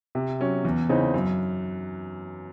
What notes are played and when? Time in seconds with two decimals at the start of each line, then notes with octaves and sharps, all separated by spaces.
0.15 C3
0.40 F#3 C#4
0.65 E2
0.89 C#3 E3 C4 D#4
1.14 F#2